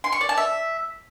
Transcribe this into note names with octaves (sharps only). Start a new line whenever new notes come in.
C6
C#6
D5
A5
E5